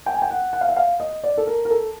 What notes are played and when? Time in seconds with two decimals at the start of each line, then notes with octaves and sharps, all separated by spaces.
0.06 G5
0.14 G#5
0.22 G5
0.30 F#5
0.53 F#5
0.61 F5
0.69 E5
0.76 F5
1.00 D#5
1.23 D5
1.37 A4
1.47 A#4
1.65 A#4
1.70 A4